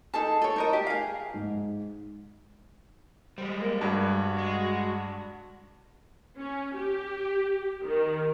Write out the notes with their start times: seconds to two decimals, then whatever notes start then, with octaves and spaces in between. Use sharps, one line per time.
0.14 D#4 G#4 A4 A5
0.42 A4 C#5
0.56 D#4 A#4 D#5
0.73 G4
0.87 G#4 F5
1.34 G#2
3.38 G3 G#3 C5
3.61 A#3
3.81 G2 F#4
4.38 G#3
6.36 C#4
6.75 G4
7.83 D#3